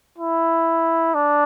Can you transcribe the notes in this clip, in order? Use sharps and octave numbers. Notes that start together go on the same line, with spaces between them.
E4
D4